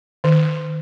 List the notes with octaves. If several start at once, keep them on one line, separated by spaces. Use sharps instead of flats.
D#3